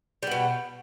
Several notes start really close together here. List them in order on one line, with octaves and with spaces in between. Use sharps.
G3 B3 B2